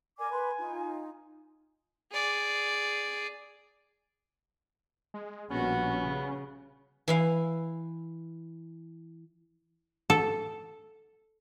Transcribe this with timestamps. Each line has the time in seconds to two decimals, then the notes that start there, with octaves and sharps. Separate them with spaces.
0.19 A#4 D5 G#5 D6
0.32 B4 B5 C6
0.58 D#4 F4
2.11 G#4 D5
5.14 G#3
5.50 A#1 B2 G3 B3 C#4 F#4
6.00 C#3
7.08 E3 E4 F5
10.10 A4